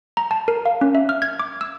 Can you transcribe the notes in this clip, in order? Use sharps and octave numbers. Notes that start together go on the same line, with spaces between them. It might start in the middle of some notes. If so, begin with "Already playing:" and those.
A#5
A5
A#4
F5
C#4
E5
F6
G#6
D6
E6